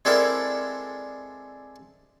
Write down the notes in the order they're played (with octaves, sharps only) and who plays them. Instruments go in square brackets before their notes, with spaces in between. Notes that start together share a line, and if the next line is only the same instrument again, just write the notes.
[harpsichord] G#3 C4 D4 E4 A4 A#4